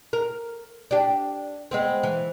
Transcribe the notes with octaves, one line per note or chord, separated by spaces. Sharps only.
A#4
D4 G4
G#3 B3 C4
E3